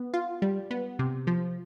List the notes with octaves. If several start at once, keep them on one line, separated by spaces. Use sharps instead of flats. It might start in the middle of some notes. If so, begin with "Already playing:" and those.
Already playing: B3
F4
G3
B3
C3
F3